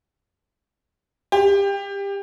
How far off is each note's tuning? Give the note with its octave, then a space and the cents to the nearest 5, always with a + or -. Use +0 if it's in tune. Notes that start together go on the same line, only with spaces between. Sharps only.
G4 +25